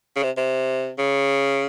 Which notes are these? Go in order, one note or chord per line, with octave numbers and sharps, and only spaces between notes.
C#3
C3
C3
C#3